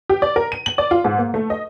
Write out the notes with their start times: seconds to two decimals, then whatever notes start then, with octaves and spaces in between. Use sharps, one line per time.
0.10 G4
0.22 D5
0.36 A#4
0.52 D#7
0.66 F#7
0.78 D5
0.91 F4
1.04 G#2
1.18 A#3
1.34 A3
1.50 D#5